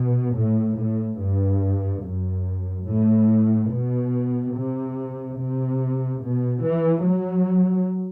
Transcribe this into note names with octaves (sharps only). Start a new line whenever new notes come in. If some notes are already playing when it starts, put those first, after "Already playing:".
Already playing: B2
A2
A2
G2
F#2
A2
B2
C3
C3
B2
E3
F#3